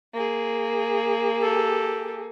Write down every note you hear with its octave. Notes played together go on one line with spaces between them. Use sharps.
A#3 G#4
G4 A4